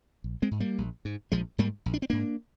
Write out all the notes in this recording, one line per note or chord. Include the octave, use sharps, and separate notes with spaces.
A#1
G#3 C4
G#2
G3 A#3
A#1
G#2
A#1 F3 G#3
G#2 G3 A#3
A#1
D4
C4
G#2 A#3 D4